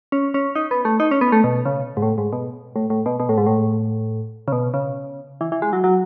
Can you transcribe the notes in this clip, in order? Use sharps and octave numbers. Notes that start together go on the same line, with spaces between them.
C#4
C#4
D#4
B3
A3
D#4
C#4
B3
A3
B2
C#3
G#2
A2
G#2
B2
A2
A2
B2
B2
A2
G#2
A2
C#3
B2
C#3
E3
E3
G#3
F#3
F#3